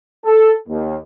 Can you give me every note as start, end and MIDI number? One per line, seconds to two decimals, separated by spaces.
0.25 0.51 69
0.68 0.97 39